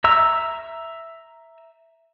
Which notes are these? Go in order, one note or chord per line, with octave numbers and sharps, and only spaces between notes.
E5 A#5 E6